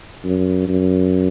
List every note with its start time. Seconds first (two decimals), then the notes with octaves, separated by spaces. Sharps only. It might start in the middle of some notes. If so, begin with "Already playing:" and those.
0.24 F#2
0.68 F#2